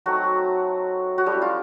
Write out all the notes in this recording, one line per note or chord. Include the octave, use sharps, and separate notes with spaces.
F#3 A3 C4 D#4 F#4
F#4
G3 A3 C#4 E4 G4
F4